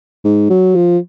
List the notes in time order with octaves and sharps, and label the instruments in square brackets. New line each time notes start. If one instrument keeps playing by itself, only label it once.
[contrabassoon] G#2
F#3
F3